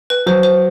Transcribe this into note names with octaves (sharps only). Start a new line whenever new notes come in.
B4
F#3 C5
C5